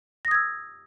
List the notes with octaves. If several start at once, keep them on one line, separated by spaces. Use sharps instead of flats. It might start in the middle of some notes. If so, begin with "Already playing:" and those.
D#6 E6 G#6 A#6